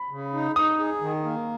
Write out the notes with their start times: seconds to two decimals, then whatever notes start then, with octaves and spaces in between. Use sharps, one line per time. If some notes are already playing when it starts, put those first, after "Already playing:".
Already playing: B5
0.10 C#3
0.33 D#4
0.56 D#4 D#6
0.78 G#4
1.01 D#3
1.24 A#3